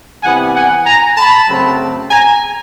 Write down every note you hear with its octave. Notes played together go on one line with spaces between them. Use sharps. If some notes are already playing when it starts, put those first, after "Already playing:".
C3 E3 G3 B3 F#5 G#5
F#5 G#5
G#5 A#5
A5 B5
F#2 C#3 F#3 A3 C4
G#5 A#5